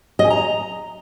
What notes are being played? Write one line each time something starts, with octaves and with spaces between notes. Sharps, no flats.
D#5
G#5
A#5